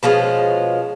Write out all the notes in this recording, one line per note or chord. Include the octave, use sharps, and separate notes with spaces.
B2 F3 G#3 C#4